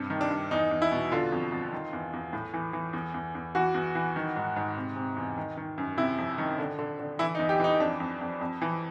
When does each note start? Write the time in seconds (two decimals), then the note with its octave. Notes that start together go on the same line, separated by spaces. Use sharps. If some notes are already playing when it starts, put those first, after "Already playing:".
Already playing: G2 C3
0.10 D#3
0.21 D4
0.30 G2
0.51 E2 D#4
0.71 E2
0.82 E4
0.91 B2
1.12 D3 F4
1.32 F2
1.52 F2
1.73 D#3
1.93 E2
2.13 E2
2.33 A2
2.54 E3
2.73 E3
2.93 E2
3.14 E2
3.35 E2
3.55 E3 F#4
3.74 E2
3.95 E3
4.16 D#3
4.36 G#2
4.56 G#2
4.77 C3
4.96 C3
5.17 E2
5.38 D#3
5.57 D#3
5.78 F#2
5.97 C3 E4
6.18 F2
6.38 D#3
6.59 D3
6.79 D3
7.00 D3
7.19 E3 E4
7.35 D#4
7.39 E2
7.49 G4
7.60 E3 D#4
7.80 F2 D4
8.00 F2
8.21 F2
8.41 F2
8.62 E3